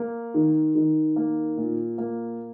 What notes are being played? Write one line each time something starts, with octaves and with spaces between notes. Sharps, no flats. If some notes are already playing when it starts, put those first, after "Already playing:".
Already playing: A#3
D#3
D#3
A#3
A#2
A#3